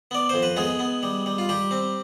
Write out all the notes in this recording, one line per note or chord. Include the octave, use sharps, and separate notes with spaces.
B3 D5
F2 C5
B4
G#3 B3 G#4
B3
G3
G3
F4
G3 G4
C4